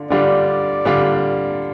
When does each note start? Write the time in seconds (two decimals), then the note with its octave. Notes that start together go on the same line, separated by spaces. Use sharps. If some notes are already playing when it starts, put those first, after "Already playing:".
Already playing: D3 D4 F4
0.10 D3 G3 D4 F4 D5
0.85 D3 G3 D4 F4